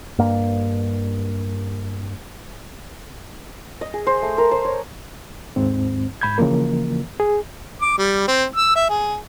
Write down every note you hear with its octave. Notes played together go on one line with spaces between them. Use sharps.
G2 A#3
D#5
G#4
C5
A3
A#4
C5
C#5
D#2 G#2 C4
G#2 B5 G6 G#6
C#3 E3 F3 A#3 A#4
G#4
D6
G3
C4
E6
E5
G#4